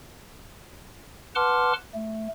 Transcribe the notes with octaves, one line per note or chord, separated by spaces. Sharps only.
B4 F#5 A5 C6 D6 F6
A3